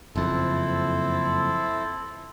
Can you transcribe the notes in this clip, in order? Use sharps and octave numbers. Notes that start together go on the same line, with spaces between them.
F#1 F2 C4 E4 A4